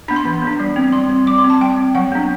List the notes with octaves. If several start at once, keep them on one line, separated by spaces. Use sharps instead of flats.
B3 D4 B5
C6
E3
B3 D4
G3
C4
G3 C6
C4
G3 D6
C6
C4
A5
G3 G5
C4
F#3 F#5
B3 D4